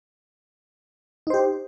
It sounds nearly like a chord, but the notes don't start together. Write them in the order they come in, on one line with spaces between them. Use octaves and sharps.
D#4 C5 G4